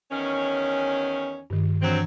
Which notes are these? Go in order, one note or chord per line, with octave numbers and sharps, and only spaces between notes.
E2 D#3 C#4
G2 D#3
E3 F#3 C4 D4